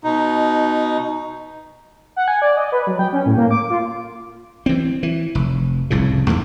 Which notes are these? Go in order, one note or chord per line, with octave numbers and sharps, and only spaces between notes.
B2 D#4
F#5
G#5
D5
D#5
B4
F#3
G5
C#4
A2
A#3
D6
F4
E3 C4
E3
F1
F1 C2 A2 C#3
D#2 G#2 A#3